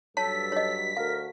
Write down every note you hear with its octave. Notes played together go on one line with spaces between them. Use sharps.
G2 F#3 A4 C#5 A5 B6
C#5 D#5
D2 F#4 A4 A#4 F5